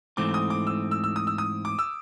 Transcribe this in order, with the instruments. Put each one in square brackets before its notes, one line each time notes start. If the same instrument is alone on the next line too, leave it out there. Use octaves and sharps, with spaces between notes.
[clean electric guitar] G#2 E3 A3 C4 [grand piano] D6
[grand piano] D#6
D6
E6
E6
E6
D#6
E6
D#6
D6
E6